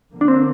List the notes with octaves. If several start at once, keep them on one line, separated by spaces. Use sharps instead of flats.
D3 F3 A#3
D4
C4